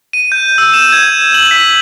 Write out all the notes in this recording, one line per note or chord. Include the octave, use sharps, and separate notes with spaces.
D#7
G6
E6
E7
G#6
F#7
B6